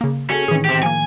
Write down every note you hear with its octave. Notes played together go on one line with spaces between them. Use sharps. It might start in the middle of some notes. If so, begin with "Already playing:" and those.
C#3 A#3
C#4 F#4 G#4 A4
A2 D#3 E3 G#4
C4 G4
F3 A#3 G#5